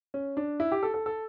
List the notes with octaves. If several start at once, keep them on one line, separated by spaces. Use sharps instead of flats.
C#4
D4
E4
G4
A4
A4
A4